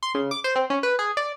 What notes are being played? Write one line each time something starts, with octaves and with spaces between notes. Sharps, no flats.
C6
C#3
D6
C5
C4
C#4
B4
G#4
D5